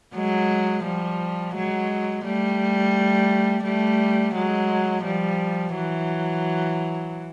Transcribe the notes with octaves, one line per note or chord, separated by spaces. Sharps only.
F#3 G#3
F3 G3
F#3 G#3
G3 A3
G3 A3
F#3 G#3
F3 G3
E3 F#3